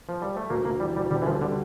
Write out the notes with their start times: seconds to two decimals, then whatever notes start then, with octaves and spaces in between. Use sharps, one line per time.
0.09 F3
0.22 G3
0.37 A3
0.50 D2 A#3
0.65 D2 A#3
0.80 E3 G3
0.96 D2 G3
1.11 D3 G3
1.22 E3
1.26 F3 G3
1.41 D3 G3